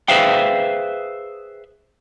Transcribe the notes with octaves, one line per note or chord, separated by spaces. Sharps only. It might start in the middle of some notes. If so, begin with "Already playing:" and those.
G#4 B4 C5 E5 F5 G5